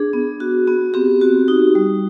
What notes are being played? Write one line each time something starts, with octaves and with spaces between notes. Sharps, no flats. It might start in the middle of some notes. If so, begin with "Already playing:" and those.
Already playing: D4 G#4
B3
F#4
B3
C4 G4
F#4
D#4
G3